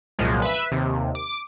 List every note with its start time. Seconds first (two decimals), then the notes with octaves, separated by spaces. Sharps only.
0.19 C2 F#2 A#2 F3 G#3
0.42 B4 E5
0.72 D#2 C3
1.15 D6